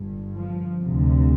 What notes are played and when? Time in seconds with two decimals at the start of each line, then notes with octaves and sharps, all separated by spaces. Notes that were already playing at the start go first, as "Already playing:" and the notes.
Already playing: G1 G2
0.35 F3
0.81 D2 C3